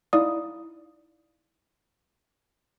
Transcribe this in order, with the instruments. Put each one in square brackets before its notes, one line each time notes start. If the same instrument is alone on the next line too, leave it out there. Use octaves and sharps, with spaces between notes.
[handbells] D#4 E4 D5 F5 D#6